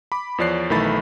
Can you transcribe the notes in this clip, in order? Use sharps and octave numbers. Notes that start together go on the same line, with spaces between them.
B5 D6
E2 F3 C#5 D5 F#6 C7
B1 D#3 E3 A3 B5 A6